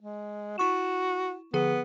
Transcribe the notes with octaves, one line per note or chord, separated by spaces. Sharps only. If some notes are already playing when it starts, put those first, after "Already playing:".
G#3
E4 F#4 C#6 E7
D3 F3 B3 G#4